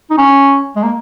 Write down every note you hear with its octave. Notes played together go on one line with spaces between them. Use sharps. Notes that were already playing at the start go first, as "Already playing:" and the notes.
D#4
C#4
G#3
A#3